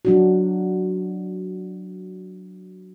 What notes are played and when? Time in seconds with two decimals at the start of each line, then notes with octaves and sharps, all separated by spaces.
0.05 F#3 D4 F#4